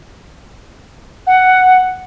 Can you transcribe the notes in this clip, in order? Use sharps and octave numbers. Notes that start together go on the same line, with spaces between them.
F#5